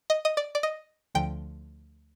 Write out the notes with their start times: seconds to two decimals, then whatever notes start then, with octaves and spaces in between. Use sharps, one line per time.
0.10 D#5
0.25 D#5
0.37 D5
0.55 D5
0.63 D#5
1.15 D2 D3 F3 G5